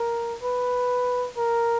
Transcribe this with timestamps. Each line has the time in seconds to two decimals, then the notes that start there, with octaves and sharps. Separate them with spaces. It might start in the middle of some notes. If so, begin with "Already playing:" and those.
Already playing: A#4
0.42 B4
1.37 A#4